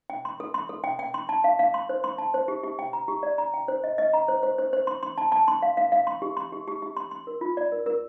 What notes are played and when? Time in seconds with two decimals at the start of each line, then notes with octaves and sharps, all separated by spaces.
0.10 G5
0.25 C6
0.40 A4
0.54 C6
0.69 A4
0.84 G5
0.99 G5
1.14 C6
1.29 A5
1.44 F5
1.59 F5
1.74 C6
1.89 C5
2.04 C6
2.18 A5
2.34 C5
2.48 G4
2.63 G4
2.79 G5
2.93 A#5
3.08 G4
3.23 D5
3.38 A#5
3.54 G5
3.68 C5
3.84 D#5
3.98 D#5
4.14 A#5
4.28 C5
4.43 C5
4.58 C5
4.73 C5
4.87 C6
5.03 C6
5.18 A5
5.32 A5
5.48 C6
5.62 F5
5.77 F5
5.92 F5
6.07 C6
6.22 G4
6.37 C6
6.52 G4
6.67 G4
6.82 G4
6.97 C6
7.11 C6
7.27 A#4
7.41 F4
7.57 D5
7.72 A#4
7.86 A#4